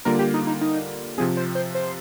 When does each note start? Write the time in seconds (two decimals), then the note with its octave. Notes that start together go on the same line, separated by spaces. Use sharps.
0.05 D3 G3 A#3 F4 A#4
0.19 G4
0.34 D#4
0.47 D#4
0.61 D#4
1.18 C3 F3 C4 G#4
1.37 C5
1.55 C5
1.75 C5